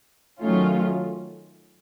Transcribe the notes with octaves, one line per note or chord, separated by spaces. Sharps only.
D#3 F#3 A3 C#4 F4